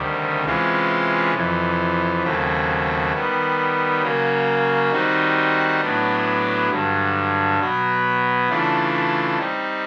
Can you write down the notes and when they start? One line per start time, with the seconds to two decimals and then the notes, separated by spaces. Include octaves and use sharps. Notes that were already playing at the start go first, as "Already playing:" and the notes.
Already playing: D2 C3 D#3 G3
0.45 C3 E3 G#3 C#4 F4
1.34 F2 C3 E3
2.23 D#2 C#3 F#3 A3 C4
3.13 D#3 G3 B3
4.02 C#3 F#3 A#3 C#4
4.92 D#3 G3 C4 D#4 F#4
5.81 A2 F#3 B3 D4
6.70 G2 D3 F#3
7.60 B2 F#3 B3
8.49 C#3 E3 A3 D4 F4
9.38 G3 C4 D#4